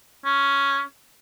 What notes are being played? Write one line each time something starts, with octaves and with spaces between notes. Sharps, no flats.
C#4